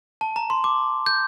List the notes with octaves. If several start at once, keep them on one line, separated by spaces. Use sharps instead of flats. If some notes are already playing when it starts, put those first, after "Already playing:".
A5
A#5
C6
D6
G6